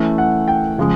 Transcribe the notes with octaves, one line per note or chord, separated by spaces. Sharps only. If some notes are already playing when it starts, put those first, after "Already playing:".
Already playing: E3 A3 C#4
F#5
G5
C#3 F3 G#3